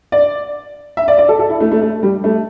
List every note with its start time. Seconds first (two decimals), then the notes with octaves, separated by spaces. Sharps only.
0.12 D5
0.97 E5
1.08 D5
1.18 D5
1.29 A4
1.39 A4
1.50 E4
1.60 A3
1.72 A3
1.82 A3
2.03 G3
2.24 A3